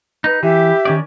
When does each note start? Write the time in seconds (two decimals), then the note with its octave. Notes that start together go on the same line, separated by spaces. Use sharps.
0.24 D#4 B4
0.43 E3 G4 E5
0.85 D#3 C#4 D5